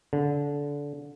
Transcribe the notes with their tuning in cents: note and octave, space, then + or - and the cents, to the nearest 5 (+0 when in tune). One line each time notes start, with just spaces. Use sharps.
D3 -25